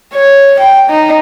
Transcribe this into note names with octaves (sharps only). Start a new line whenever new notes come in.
C#5
G5
D#4